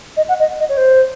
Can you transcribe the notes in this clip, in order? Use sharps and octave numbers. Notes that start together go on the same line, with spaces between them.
D#5
F#5
D#5
D#5
C#5
C5